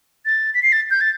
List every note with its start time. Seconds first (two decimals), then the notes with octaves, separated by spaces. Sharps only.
0.26 A6
0.54 B6
0.63 C7
0.72 A6
0.91 G6
1.01 A6